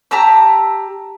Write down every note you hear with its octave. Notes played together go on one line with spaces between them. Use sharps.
G4 A5 A#5 E6